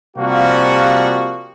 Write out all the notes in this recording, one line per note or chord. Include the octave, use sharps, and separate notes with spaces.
C3 F3 G3 A#3 F#4